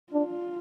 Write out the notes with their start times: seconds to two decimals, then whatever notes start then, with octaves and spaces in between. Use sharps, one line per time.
0.13 D4 F4